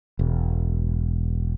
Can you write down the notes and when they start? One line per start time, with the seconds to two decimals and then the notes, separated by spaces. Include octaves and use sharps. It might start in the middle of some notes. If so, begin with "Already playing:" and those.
0.19 E1